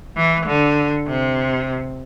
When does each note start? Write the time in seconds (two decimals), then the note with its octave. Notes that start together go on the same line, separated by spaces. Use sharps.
0.17 E3
0.47 D3
1.07 C3